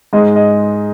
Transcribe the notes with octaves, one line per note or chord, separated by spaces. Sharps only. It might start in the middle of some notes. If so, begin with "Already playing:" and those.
G#2 G#3 D#5
D#5